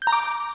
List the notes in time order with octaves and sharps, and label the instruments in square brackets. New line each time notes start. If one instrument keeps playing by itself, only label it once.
[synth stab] G6
A#5
D6